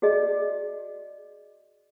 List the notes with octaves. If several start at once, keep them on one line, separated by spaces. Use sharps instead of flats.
F#4 G#4 D5 D#5